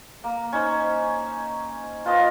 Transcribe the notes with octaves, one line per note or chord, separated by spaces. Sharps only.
A#3
C#4 D#4 C5
F4 B4 D#5 A5